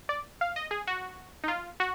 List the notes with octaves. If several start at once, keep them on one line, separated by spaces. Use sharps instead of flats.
D5
F5
D#5
G#4
F#4
D#4
F4
F#4